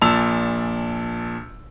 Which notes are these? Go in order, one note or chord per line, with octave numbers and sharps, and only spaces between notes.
A#1 A#2 A5 E6 F7